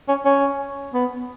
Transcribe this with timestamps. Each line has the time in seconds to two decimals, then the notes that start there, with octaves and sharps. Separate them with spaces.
0.08 C#4
0.25 C#4
0.94 B3